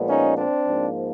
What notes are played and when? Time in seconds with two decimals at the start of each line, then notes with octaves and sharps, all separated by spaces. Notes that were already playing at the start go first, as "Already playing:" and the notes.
Already playing: A#2 F3 G#3 B3
0.08 C#4 D#4
0.37 C4 D4
0.66 G#2 F3 A#3